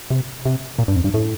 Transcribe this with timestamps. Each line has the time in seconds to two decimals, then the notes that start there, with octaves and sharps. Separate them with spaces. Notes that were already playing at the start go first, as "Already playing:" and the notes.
0.10 C3
0.45 C3
0.79 A#2
0.88 G2
0.96 F2
1.04 G2
1.14 A2